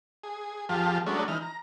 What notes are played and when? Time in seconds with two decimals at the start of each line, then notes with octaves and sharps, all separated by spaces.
0.24 G#4
0.69 F2 F3 G4 G#4 F5 A5
1.07 F#3 G#3 A3 C#4 D4
1.28 E3 D#4 F6
1.42 A#5